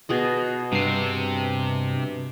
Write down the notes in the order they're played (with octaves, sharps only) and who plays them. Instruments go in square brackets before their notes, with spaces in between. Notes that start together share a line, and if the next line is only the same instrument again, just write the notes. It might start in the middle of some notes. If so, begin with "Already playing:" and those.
[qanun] B2 G#4 D#5
[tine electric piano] G2 C7 [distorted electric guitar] C3